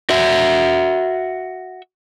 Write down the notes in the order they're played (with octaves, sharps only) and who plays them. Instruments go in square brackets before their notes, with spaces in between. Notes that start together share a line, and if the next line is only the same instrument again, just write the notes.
[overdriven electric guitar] F#4 E5